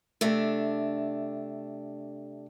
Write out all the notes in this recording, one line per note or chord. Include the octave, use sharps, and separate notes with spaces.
C3 A3 D4